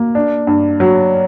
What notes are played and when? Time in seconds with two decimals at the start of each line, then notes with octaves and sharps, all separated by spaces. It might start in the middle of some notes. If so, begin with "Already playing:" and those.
Already playing: A#3
0.15 D4
0.47 G2
0.80 F#3